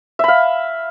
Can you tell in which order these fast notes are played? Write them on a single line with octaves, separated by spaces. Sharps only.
E5 B5 F5